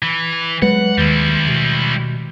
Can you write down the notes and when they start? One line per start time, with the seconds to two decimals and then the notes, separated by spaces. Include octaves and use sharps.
0.03 E3
0.62 F#3 G#3 B4 F#5
0.98 D#2 D#3 G3 E4
1.47 B2